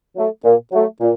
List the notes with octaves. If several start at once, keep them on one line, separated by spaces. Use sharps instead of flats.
F#3 A3
A#2
F#3 A3
A#2